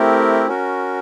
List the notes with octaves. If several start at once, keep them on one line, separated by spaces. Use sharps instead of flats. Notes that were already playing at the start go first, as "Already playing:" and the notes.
Already playing: A3 C4 E4 G4 A#4
C#4 F#4 A#4